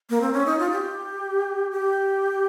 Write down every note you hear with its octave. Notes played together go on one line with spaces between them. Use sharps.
A#3
C4
C#4
D#4
F4
G4
G4